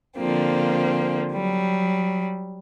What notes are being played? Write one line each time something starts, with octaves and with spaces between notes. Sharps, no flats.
D3 F3 A#3 C4
F#3 G3